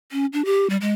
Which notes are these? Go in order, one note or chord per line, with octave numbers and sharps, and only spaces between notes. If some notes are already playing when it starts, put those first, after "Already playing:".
C#4
D4
G4
G3
G#3